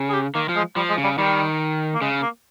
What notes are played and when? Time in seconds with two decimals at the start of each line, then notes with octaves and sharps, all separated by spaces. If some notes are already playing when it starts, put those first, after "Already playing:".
Already playing: C#3
0.10 G#4
0.13 G4
0.35 D#3 A#3
0.49 F3
0.56 G#3
0.76 F3 G3
0.90 G#3
0.98 C#3
1.04 G3
1.18 D#3 G3
1.95 A#3
2.01 C#3 G#3
2.22 A#3